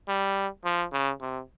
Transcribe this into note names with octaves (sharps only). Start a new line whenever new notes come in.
G3
F3
C#3
C3